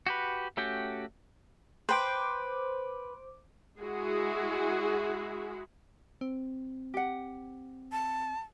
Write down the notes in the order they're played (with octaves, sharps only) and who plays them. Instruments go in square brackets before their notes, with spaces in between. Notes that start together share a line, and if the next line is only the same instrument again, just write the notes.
[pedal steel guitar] F#4 G4 B4
A3 C#4 F#4 G4 G5
[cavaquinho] B4 G5 [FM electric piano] C5 D6
[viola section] G#3 E4 F#4 G#4
[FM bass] C4
[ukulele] G4 F#5
[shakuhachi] A5